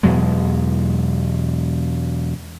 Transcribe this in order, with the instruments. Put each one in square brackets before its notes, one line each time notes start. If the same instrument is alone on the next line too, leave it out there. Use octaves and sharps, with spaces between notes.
[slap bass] E2 B2 F#3 G#3